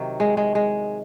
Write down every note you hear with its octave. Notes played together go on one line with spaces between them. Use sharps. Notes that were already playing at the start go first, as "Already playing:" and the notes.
Already playing: C3 D#3 F#3
G#3
G#3
G#3